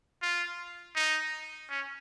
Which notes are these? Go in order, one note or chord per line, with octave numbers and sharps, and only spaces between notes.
F4
D#4
C#4